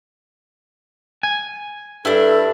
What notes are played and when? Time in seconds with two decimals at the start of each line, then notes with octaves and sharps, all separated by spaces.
1.23 G#5
2.05 G2 D4 E4 A4